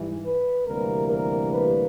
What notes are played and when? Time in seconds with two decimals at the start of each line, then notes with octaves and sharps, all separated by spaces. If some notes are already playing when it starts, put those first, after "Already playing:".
Already playing: G#2 E3 G3
0.24 B4
0.66 D2 C3 E3 G3 A#3 A#4
1.08 A#4
1.51 B4